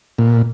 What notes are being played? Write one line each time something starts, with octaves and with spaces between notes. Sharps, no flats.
A#2